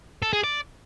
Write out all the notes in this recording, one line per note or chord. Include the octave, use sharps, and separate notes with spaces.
A4
G#4
D5